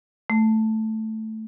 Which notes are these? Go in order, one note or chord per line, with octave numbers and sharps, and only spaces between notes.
A3